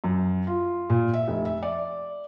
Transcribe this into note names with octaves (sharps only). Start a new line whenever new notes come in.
F#2
F4
A#2
E5
F1
E5
D5